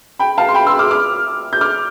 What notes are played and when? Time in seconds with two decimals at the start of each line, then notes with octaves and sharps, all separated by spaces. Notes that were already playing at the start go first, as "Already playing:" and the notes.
0.19 G5 B5
0.38 F5 A5
0.49 C6
0.55 G5 B5
0.67 C6 E6
0.79 D6 F6
0.91 D6 F6
1.53 G6
1.61 D6 F6